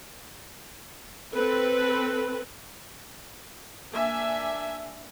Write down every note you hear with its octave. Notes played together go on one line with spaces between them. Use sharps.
C4 A4 B4
A#3 D4 E5 G#5